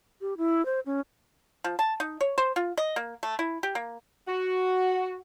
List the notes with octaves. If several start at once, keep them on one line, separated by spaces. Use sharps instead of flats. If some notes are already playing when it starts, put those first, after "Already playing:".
G4
E4
C5
C#4
F3
A5
D#4
C#5
C5
F4
D#5
A#3
A3
E4
G4
A#3
F#4